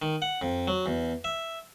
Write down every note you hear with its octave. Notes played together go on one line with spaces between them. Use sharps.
D#3
F#5
F2
F#3
E2
E5